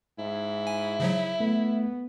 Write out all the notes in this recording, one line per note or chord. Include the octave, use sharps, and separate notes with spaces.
G#2 E4
G#5
C#3 F3 F#3
A3 B3